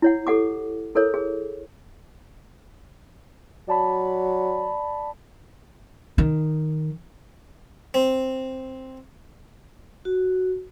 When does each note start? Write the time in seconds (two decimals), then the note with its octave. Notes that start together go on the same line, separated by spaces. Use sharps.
0.02 E4 C#5 F#5
0.27 G4 A4 F#5 D6
0.95 E4 A4 A#4 C#5
1.14 G#4 A#4
3.68 F#3 D5 A5 B5
6.18 D#3
7.94 C4
10.05 F#4